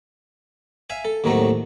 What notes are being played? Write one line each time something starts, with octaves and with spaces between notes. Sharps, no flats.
E5 F5 G#5
A4
D#2 A2 D#3 F#3 A3 C4